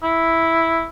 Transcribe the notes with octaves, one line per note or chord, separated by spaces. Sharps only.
E4